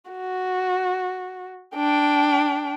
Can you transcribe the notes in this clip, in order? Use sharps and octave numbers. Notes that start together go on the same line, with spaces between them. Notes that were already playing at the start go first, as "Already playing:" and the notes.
F#4
D4 G5